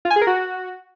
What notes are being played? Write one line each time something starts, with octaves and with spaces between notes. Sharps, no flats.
F4
G#5
G#4
A#4
F#4